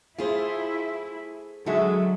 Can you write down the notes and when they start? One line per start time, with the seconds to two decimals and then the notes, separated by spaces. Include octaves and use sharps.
0.18 A3 E4 F4 G#4 C5
1.66 D3 F#3 G#3 F#4 A4 E5